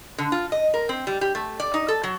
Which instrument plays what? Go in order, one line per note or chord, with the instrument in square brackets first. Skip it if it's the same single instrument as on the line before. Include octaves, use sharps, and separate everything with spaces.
[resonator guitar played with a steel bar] D3
F4
D#5
A#4
C4
G3
G4
A3
D5
D#4
A4
F#3